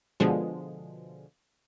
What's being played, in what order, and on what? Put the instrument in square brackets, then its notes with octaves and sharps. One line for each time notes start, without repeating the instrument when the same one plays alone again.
[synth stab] B2 D3 F3 G#3